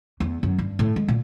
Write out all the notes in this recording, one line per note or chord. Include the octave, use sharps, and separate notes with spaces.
E2
F#2
G2
A2
G#3
A#2